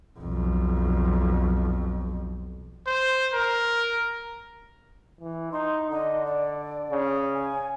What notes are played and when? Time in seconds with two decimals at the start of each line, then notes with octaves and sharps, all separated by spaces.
0.19 B1 F2
2.87 C5
3.34 A#4
5.21 E3
5.53 D#4 C6
5.90 D3 D#5
6.26 D5
6.92 C#3
7.34 G#5